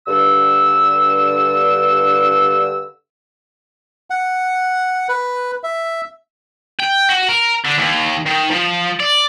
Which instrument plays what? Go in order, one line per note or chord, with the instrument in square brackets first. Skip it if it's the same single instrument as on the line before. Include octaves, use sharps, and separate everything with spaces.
[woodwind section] G2 D3 E6
[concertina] F#5
B4
E5
[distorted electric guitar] G5
F#4
A#4
D3
D#2
D#3
F3
D5